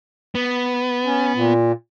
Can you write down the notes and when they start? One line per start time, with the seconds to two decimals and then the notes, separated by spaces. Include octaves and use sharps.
0.35 B3
1.05 C#4
1.35 A#2